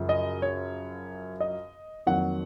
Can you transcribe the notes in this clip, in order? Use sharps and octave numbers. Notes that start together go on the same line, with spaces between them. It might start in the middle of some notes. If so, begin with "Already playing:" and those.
Already playing: F#2 C#3 F3
D#5
C#5
D#5
F2 D#3 F#3 A#3 F#5